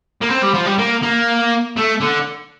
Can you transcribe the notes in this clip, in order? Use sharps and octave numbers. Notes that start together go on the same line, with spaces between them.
A#3
C4
G3
F3
G3
A#3
A#3
A3
D3